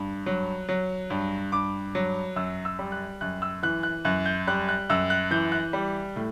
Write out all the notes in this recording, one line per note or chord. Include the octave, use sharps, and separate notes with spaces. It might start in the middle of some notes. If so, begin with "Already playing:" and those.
Already playing: G2
F#3
F#3
G2
G2 D6
F#3
F#2 E6
E6
G3
F#6
F#2 F#6
E6
E3 F#6
F#6
F#2 F#6
G6
G3 F#6
F#6
F#2 E6
F#6
E3 G6
F#6
G3
A2